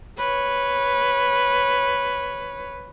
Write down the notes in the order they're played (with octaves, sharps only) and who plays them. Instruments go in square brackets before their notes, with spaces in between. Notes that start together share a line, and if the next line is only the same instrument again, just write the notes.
[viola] B4 C#5